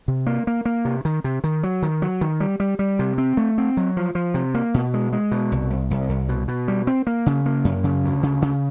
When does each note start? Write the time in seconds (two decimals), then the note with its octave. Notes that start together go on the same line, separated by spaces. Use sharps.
0.08 C3
0.27 A#3
0.47 A#3
0.65 A#3
0.85 C3
1.05 D#3
1.24 C3
1.44 D#3
1.63 F#3
1.82 D#3
2.02 F#3
2.21 D#3
2.40 G3
2.60 G3
2.79 G3
2.99 C3
3.18 C4
3.37 A3
3.58 C4
3.77 F#3
3.97 F3
4.15 F3
4.34 C3
4.54 A#3
4.74 B2
4.94 G#3
5.13 G#3
5.32 B2
5.52 C2
5.70 C2
5.91 C2
6.09 C2
6.29 B2
6.48 B2
6.68 G3
6.87 C4
7.07 A#3
7.26 C#3
7.46 A#3
7.65 F#2
7.84 C#3
8.04 D2
8.23 C#3
8.42 C#3